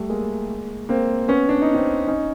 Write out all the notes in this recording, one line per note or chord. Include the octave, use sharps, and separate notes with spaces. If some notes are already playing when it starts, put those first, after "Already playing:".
Already playing: G3 A3
G#3 A#3
A#3 C4
B3 C#4
D4
D#4
C4 D4
C#4 D#4